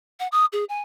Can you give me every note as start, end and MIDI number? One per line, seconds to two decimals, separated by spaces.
0.20 0.28 78
0.32 0.46 87
0.53 0.64 68
0.69 0.82 80